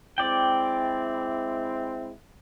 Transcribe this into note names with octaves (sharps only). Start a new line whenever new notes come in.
G#3 C4 E4 D5 G5